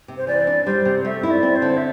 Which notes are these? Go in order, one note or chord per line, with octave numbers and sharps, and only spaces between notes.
C3
C5
E3 D5
D4
G3 C5
C3
A3 E5
E4
D5
C4
C5
D3
E5